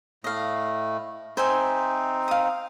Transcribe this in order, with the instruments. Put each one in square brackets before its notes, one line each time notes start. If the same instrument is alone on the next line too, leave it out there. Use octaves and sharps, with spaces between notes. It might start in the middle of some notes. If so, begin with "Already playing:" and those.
[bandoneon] A2 A3 [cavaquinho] D#5 F5
[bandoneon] C4 D#4 [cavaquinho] C5 E5 G#5
[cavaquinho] F5 D#6